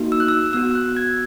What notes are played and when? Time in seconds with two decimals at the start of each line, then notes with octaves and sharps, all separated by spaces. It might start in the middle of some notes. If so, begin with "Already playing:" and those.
Already playing: A#3 D#4 F#4
0.12 E6
0.20 F#6
0.28 E6
0.53 B3 F#4 E6
0.71 E6
0.75 F#6
0.97 G#6